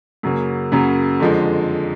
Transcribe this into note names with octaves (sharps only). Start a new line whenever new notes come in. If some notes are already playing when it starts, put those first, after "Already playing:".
F#2 C#3 F#3 A#3
F#2 C#3 F#3 A#3
F2 D3 F3 G#3